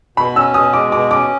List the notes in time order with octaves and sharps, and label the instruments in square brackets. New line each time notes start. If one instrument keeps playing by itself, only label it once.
[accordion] B2 [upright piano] B5
[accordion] C#4 [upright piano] E6
[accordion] B2 [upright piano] D#6
[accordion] G#3 [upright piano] D6
[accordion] B2 [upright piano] D6
[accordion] C#4 [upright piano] D6